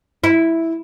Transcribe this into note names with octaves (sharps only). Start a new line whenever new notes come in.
E4